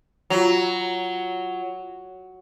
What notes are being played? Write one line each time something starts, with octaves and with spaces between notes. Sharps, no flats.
F#3 F4 F7